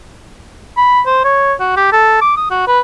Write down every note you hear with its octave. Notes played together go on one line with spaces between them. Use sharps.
B5
C5
C#5
F#4
G4
A4
D6
D#6
F#4
B4